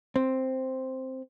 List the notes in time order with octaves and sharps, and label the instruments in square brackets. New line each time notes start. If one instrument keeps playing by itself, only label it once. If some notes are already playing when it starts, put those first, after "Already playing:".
[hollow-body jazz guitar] C4